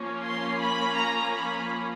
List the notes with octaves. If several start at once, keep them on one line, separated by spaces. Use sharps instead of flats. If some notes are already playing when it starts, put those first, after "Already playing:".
Already playing: F3 A#3 C#4
C6
B5
A#5
B5